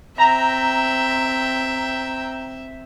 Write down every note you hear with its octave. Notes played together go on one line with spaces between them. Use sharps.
C4 E5 G5 A#5